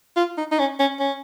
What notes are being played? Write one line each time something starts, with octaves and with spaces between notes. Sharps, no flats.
F4
D#4
D#4
C#4
C#4
C#4